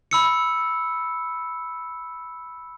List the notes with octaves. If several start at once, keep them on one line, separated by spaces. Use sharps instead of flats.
B5 E6 C#7